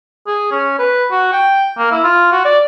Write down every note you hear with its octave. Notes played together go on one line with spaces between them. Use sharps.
G#4
C#4
B4
F#4
G5
A#3
E4
F4
F#4
D5